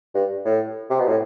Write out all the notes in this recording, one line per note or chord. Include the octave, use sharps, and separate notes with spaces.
G2
A2
C3
B2
A2